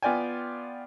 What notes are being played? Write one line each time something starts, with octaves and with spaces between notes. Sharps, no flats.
B3 F4 D5 G5 G#5